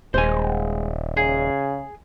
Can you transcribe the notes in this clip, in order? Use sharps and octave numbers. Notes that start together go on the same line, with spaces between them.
D#1 G#3 C5 G#5
C#3 G#4